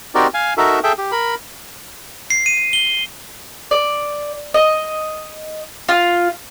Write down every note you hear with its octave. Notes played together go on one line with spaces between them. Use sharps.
C4 D#4 F#4 G4 A#4 D5
F5 G#5
D#4 F#4 A4 A#4 E5
G#4 A4 E5 G5
G4
A#4 B5
C7
D#7
G7
D5
D#5
F4